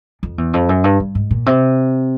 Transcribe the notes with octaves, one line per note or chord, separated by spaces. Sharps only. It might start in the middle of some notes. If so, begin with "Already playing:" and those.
F2
E2
F2
F#2
G2
G2
G#2
A#2
C3